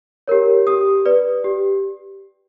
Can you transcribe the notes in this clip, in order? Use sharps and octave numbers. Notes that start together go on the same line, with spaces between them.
G4 A#4 C#5
G4 D#6
B4 D5
G4